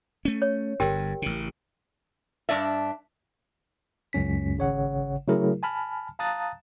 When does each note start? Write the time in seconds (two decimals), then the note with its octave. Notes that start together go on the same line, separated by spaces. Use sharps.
0.25 A3 C#4
0.42 C#5
0.80 G1 G2 G4 A#4 G5
1.22 A1 C#3
2.49 G2 D4 D5 E5
4.13 C#2 F#2 C#4 B6
4.57 G#1 C#3 C#5 F#5
5.27 C#3 F#3 A3 E4 G#4 A#4
5.63 G#5 A5 B5 F6
6.19 F5 A5 A#5 D#6 F#6 A6